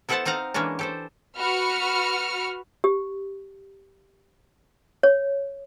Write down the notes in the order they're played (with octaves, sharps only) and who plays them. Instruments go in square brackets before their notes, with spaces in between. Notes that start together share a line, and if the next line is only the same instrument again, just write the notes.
[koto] B3 E4 A4 C5 F#5 A5
C4 D#4 F5 F#5 A#5
E3 G#3 A#3 C#4 D4
G4 A4 C5
[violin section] F#4 B4 B5 F6 C#7
[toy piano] G4
C#5